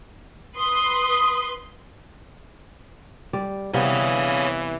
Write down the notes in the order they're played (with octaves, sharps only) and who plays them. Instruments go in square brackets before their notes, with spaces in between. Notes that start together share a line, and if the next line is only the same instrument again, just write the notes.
[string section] B4 C6 [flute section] D#6
[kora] G3 D5
[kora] C3 G3 B3 [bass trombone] E3 [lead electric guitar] C#5 F5